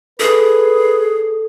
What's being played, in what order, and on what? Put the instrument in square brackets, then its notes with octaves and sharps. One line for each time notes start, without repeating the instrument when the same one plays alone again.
[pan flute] G#4 [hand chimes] A4 [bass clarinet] B4